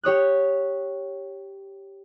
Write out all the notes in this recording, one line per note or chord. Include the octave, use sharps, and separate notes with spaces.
G4 C#5 D#6 F#6